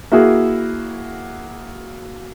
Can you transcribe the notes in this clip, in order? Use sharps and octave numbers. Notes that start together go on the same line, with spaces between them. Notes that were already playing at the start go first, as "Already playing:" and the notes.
A#3 E4 F#4 G#4